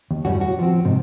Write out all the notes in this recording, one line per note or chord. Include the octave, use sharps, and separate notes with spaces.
D#2
F#2 A2 G3 C#4 F#4
F#4
F3 C4
D2 G#2 C3